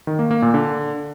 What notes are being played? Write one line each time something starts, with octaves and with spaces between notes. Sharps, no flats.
D#3
A#3
A#3
A#2
D3